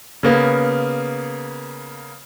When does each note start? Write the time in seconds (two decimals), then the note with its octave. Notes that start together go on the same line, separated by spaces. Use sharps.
0.23 C#3 A#3 B3